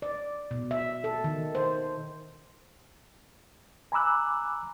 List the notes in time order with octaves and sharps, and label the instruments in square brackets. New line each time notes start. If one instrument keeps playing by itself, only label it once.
[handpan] D5
B2
E5
A4
D#3
C5
[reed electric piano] G#5 A#5 B5 D6 E6 F#6